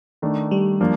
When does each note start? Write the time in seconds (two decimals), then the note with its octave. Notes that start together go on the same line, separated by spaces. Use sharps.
0.22 D#3 A3 D4
0.51 G3
0.80 F3 A#3 D4